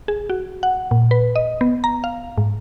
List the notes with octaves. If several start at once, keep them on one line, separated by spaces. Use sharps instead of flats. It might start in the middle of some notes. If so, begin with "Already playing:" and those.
G#4
F#4
F#5
A#2
B4
D#5
B3
A#5
F5
G#2